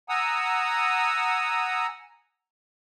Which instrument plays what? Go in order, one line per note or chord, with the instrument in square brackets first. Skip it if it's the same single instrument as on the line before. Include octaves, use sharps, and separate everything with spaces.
[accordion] F#5 G#5 A#5 D#6 E6